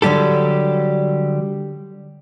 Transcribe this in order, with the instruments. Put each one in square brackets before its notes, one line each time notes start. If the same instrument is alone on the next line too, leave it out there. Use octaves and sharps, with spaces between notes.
[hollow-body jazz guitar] D3 F#3 G3 G4 A4